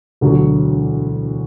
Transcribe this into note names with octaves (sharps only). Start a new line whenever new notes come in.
E1 D2 D3 F#3